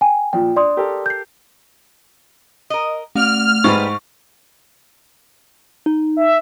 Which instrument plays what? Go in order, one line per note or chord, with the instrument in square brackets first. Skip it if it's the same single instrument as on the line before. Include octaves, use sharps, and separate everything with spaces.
[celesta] G5 G#5
[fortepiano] A#2 F3 [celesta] G5
[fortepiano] D4 [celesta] D5 C6 D#6
[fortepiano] G4 A4 A#4
[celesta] G6 C7
[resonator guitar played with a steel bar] A#4 D#5
[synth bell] A3 [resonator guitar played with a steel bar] F#4 D5 [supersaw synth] F6
[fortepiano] G#2 [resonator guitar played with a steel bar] G3 B4 [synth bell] C#6
[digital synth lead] D#4
[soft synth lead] E5